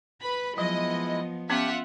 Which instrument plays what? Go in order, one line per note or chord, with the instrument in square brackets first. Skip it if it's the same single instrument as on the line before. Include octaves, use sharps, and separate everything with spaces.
[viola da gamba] B4 [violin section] B5
[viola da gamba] F3 B3 [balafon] F#3 [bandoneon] G#3 E4 [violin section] D#5
[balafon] B3 C#4 A5 [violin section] F4 E5 F#5 [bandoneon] G4